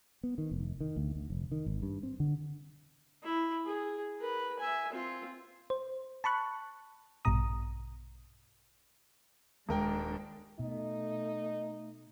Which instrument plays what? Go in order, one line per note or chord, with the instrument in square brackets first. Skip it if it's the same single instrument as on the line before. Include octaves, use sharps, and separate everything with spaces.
[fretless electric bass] B3
D#3
F1
D#3
D2
D2
F1
D#3
G#1
G2
C4
D3
[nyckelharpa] E4
G#4
A#4 B4
E5 G#5
C4 F4
[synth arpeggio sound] C5
A5 B5 C#6 F#6
A#1 G2 B2 A#5 D#6
[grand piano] D#1 A#4 G5 [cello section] G#3 D4
[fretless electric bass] B2 [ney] A3 [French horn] D#4